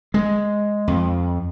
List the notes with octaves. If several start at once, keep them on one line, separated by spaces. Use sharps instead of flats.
G#3
F2